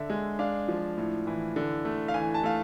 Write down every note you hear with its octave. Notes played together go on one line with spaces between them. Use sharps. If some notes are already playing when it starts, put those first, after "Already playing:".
Already playing: D3 E5
G#3
D4 F5
F3
A2
E3
D3
A3
F5
E3 G#5
A5
A3 F5